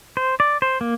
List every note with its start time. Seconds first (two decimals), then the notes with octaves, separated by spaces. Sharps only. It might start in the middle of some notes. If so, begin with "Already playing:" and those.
0.17 C5
0.40 D5
0.62 C5
0.81 A#3